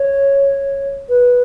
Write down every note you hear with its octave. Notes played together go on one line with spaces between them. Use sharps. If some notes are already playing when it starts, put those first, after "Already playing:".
Already playing: C#5
B4